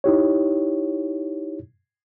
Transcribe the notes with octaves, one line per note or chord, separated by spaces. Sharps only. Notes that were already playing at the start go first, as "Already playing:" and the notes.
D#4 E4 G4 C#5